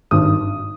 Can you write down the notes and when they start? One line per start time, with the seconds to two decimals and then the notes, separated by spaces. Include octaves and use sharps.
0.11 G#1 G2 D#3 D#6